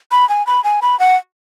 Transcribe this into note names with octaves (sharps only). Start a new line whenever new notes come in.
B5
G#5
B5
G#5
B5
F#5